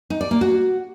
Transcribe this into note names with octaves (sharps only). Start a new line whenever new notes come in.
D#4
D5
A#3
F#4